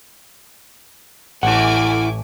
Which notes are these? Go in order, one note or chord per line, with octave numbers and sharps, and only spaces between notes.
A1 A3 E4 F#5 G#5 D6